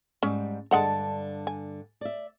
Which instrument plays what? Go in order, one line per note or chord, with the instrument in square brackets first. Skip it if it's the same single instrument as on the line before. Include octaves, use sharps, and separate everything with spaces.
[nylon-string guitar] G#2 G3 [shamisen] C#4
[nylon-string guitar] G2 D3 A5 [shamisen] G#3 F#5 A#5
[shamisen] G#5
[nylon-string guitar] D5 E5